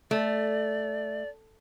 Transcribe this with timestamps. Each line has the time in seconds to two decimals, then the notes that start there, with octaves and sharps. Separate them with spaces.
0.11 A3 D5